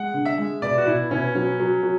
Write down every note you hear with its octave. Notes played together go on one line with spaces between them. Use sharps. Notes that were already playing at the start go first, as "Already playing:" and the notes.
Already playing: G#3 F#5
D3
E5
G#3
B2 D5
F#4
B2 E4
B2 C#4
F#3 C#4
F#3
F#3